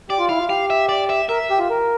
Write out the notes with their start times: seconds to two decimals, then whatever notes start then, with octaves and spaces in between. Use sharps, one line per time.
0.09 G4 D5
0.19 F4
0.29 E4 F5
0.39 F4
0.49 G4 F5
0.70 E5
0.89 D5
1.10 E5
1.29 A#4 E5
1.50 G4
1.59 F4
1.70 A#4